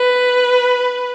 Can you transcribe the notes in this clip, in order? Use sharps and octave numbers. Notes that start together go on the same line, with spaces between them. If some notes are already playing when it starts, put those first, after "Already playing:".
Already playing: B4